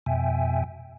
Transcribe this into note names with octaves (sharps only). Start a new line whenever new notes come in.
F2 B2 E5 G5 G#5